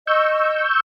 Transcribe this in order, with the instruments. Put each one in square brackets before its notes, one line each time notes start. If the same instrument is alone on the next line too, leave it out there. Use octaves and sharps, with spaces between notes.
[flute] D#5 [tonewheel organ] C#6 E6 G6